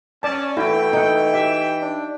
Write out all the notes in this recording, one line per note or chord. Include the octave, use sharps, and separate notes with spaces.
C#4 D5 A5
E3 A3 E4 F#4 G5
D#4 F#5
G4 E5
D4